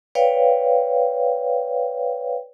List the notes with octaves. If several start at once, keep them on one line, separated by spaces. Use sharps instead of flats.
B4 C#5 D5 F5 G5